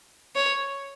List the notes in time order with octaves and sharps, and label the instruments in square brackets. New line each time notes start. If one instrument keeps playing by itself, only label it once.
[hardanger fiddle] C#5